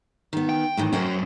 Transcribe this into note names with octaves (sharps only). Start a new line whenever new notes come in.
D#3 B3
G5
A2 D#3 E3
F#3 C#4 A#4 C5 G5